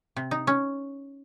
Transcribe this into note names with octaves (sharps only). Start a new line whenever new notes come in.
C3
D#4
C#4